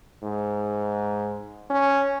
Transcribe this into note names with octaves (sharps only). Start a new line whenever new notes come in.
G#2
C#4